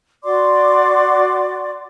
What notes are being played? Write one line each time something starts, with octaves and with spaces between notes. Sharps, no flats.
F#4 D5 C6 D6